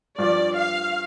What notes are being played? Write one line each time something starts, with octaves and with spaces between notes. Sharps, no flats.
G2 F3 D4 D5
F5